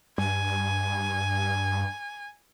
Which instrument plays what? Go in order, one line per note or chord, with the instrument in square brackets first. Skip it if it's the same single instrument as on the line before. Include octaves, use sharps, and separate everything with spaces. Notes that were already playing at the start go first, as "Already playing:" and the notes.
[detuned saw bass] G2 [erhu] G#5